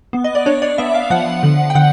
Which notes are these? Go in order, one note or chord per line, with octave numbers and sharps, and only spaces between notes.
B3
D#5
D5
D4 C#5
D5
B3 E5
F5
F3 F#5
D3
G5
D3 F#5